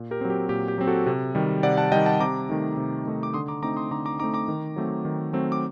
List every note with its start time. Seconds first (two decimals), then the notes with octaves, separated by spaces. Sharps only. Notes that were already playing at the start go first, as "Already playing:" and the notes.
Already playing: A#2
0.11 G4 A#4
0.21 F#3 C4
0.30 G4
0.49 A#2 G4
0.68 G4
0.78 F#3 C4
0.87 F#4 A4
1.06 C3
1.35 D#3 G3
1.63 C3 D5 F#5
1.77 F#5 A5
1.92 D#3 G3 D#5 G5
2.06 F#5 A5
2.20 C3 A#5 D6
2.49 D#3 A3 D#4
2.77 C3
3.06 D#3 A3 D#4
3.23 D6
3.34 D3 C6 D#6
3.48 A#5 D6
3.62 A3 C4 D#4 A#5 D6
3.76 C6 D#6
3.91 D3 A#5 D6
4.06 A#5 D6
4.19 A3 C4 D#4 A#5 D6
4.34 A#5 D6
4.48 D#3
4.76 F#3 A3 C4
5.05 D#3
5.33 F#3 A3 C4
5.52 D6